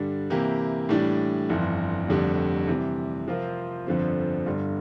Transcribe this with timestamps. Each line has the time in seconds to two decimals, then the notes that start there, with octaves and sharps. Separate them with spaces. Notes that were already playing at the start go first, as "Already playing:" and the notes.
Already playing: G2 D3 G3 D4
0.30 C3 E3 A#3 E4 G4
0.89 A2 E3 G3 D4
1.49 G1 F2 E3
2.08 F1 F2 D3 G3
2.68 C3 E3 G3
3.27 C3 F3 C4 F4 A#4
3.87 G1 F2 D3 F3 C4
4.46 G1 G2 D3 G3